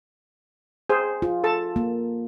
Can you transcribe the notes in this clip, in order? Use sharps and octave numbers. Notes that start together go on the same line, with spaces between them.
G#4 C5
F4
A4 A5
A#3